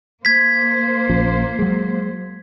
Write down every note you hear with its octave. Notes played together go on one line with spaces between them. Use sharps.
A#3 C5 G#6 B6
A#1 F3 C#4
F#3 G#3